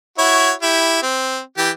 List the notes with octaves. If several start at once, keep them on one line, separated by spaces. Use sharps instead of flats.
E4 F#4 C#5
E4 G4
C4
E3 G4